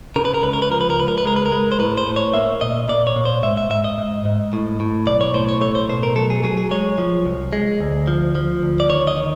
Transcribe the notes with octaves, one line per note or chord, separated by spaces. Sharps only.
C#3 A#4
B4
A#4
C#2 B4
A#4
B4
F3 A#4
B4
A#4
C#2 B4
A#4
B4
G#3 A#4
B4
A#4
G#3
C5
A2 B4
C5
A2
C#5
A#3 E5
A#2 D#5
A#2 D5
C#5
A#2
C5
G#2 E5
E5
G#2 E5
D#5
G#2
G#2
A2
A2
B1 D5
C#5
A2 C5
C#5
A3 C#5
C5
B2 C5
A#4
F#3 A4
G#4
F#3 G#4
G#4
G#3 C#5
F3
C2
G#3
D2
F3
F3
D2
D5
D#3 C#5
D#5
D#3